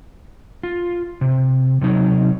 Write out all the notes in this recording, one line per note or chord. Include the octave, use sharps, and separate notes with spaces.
F4
C3
C3 F#3 D#4